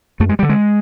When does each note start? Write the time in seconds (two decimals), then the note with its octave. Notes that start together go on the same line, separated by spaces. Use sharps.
0.20 F#2 A3
0.29 G#3
0.39 D3 G3
0.49 G#3